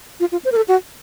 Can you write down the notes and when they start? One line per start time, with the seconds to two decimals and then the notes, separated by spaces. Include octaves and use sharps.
0.20 F4
0.32 F4
0.45 C5
0.52 A#4
0.56 A4
0.68 F#4